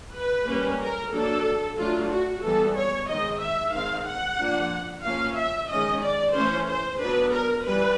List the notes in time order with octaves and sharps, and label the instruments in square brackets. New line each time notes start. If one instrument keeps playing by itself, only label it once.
[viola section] B4
G3 A#3 C#4
A#4
F#3 A#3 D4 A4
F#3 A3 D4 F4
F#4
E3 G3 B3 A4
C#5
D#3 G#3 C4 D#5
E5
D#3 G#3 C4 F5
F#5
F3 A#3 D4
F3 A#3 C#4 F5
E5
D#3 G#3 C#4 D#5
D5
E3 A3 C#4 C5
C5
F#3 B3 D4 B4
A#4
E3 G3 B4